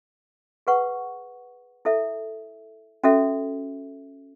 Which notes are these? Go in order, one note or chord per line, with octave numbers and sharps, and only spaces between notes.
G#4 B4 F#5 C#6
E4 A4 E5
C#4 F#4 A4 E5